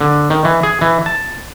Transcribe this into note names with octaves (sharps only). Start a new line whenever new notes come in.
D3
D#3
E3
G#4
E3
A5